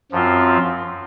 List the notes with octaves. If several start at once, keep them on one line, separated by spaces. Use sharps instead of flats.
F#2 F3 C4 F4